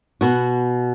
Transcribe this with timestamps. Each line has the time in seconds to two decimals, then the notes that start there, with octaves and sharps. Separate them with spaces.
0.21 B2 F#4